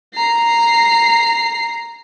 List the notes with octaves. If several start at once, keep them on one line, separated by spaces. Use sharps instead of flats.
A#5 C7